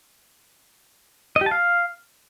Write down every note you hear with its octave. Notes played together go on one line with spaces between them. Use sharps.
D#5
G4
A5
F5